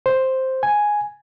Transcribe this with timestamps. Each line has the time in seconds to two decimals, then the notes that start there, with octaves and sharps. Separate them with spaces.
0.06 C5
0.63 G#5